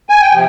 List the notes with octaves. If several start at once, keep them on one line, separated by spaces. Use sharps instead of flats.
G#5
G5
C3 F3